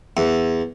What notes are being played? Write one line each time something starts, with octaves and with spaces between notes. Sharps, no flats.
E2